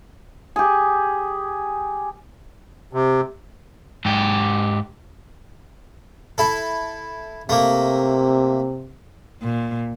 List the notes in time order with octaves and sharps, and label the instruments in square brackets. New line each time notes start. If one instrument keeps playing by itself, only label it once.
[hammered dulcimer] G4 G#4
[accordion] C3
[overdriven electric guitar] G#2 G4
[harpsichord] E4 A4
[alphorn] C3 [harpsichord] A3 A#3
[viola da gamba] A#2